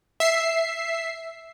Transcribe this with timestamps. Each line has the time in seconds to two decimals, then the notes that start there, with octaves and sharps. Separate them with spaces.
0.20 E5 C7